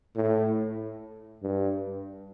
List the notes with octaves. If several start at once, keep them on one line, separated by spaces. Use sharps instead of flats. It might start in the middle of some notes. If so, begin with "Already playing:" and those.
A2
G2